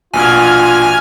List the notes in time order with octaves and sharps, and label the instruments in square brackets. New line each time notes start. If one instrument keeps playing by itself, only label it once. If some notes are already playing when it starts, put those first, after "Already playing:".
[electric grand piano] A#1 B2 [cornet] F4 [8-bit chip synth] G#5 F6